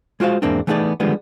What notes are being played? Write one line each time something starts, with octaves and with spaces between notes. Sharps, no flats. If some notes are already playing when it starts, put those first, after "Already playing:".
G#3 F4 F#4 C5 F5
E2 G#2 A#3 C4 D4
E3 A3 B3 D#4 G#4 D5
D3 D#3 F3 G3 G#3 B3